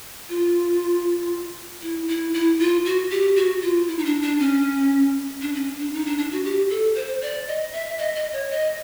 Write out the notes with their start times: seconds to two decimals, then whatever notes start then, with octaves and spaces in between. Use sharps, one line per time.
0.29 F4
1.82 E4
2.08 E4
2.34 E4
2.59 F4
2.85 F#4
3.11 G4
3.36 F#4
3.62 F4
3.88 E4
3.98 D#4
4.05 D4
4.22 D4
4.39 C#4
5.42 D4
5.55 C#4
5.80 D4
5.94 D#4
6.06 D4
6.18 D4
6.32 F#4
6.44 G4
6.70 A4
6.95 C5
7.22 D5
7.47 D#5
7.73 E5
7.98 D#5
8.15 D#5
8.33 C#5
8.50 D#5